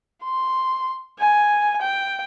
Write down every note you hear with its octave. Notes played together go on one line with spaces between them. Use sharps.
C6
G#5
G5